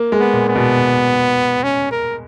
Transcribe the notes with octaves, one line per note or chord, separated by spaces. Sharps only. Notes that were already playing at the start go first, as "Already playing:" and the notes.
Already playing: A#3
G#3
B3
A#2
B3
B2
C#4
A#4